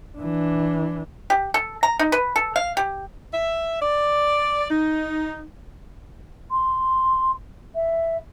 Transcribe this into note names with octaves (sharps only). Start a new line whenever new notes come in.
E3 D4
G4
A4
A#5
D#4
B4
A4
F5
G4
E5
D5
D#4
C6
E5